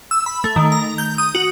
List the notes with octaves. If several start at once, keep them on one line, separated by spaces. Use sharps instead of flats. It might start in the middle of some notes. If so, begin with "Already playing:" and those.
E6
B5
A3
D#3
A#5
G6
D#6
F#4